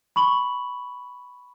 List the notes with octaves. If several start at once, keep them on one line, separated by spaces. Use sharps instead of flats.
B5 C#6 F#7